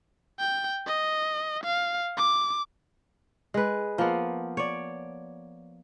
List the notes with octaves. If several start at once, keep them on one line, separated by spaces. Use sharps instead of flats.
G5
D#5
F5
D6
G#3 B4
F3 A#3 B3
C#5 D5